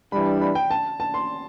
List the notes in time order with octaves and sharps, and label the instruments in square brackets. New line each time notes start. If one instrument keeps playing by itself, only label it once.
[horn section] E3 G3 D4 [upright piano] B5
[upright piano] B5
G5
A5
A5
C6